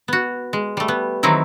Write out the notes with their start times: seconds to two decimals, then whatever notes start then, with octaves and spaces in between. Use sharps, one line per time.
0.08 B3 F#4
0.53 G#3
0.77 G3 A3
0.88 B3
1.23 D#3 E3 F#3 C4 D#4 E4